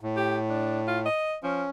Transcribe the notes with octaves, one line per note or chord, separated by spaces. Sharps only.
A2
G4
D4
F4
D#5
F3 C#4